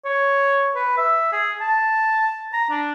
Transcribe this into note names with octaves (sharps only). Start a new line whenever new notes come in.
C#5
B4
E5
G#4
A5
A#5
D4